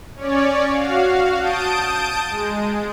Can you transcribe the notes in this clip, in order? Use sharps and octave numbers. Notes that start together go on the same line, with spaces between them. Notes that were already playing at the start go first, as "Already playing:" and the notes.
C#4 C#5 D5
F#4 F5
A5 D#6 G6 D7
G#3